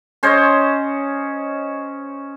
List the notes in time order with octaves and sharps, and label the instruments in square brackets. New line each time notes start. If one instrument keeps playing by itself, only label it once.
[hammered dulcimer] C#4 C5 C#5 D#5